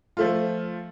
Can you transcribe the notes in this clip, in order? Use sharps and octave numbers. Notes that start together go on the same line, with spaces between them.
F3 A3 F4